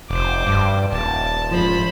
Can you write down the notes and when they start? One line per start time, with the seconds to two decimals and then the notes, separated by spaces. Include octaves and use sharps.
0.10 F1 C5 D6
0.47 G2
0.92 D#1 A5
1.51 G#2 C#3 F3 C5 B5